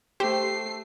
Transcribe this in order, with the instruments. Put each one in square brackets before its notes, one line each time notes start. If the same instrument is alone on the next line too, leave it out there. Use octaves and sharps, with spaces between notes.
[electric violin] A3 C7 [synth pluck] G4 C5